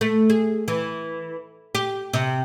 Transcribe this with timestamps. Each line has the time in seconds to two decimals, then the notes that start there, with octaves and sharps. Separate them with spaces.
0.01 A3
0.30 G#4
0.68 E3
1.75 G4
2.13 C3